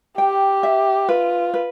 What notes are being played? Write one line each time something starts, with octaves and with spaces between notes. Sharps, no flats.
G4 G5
E5
F4 B4
B4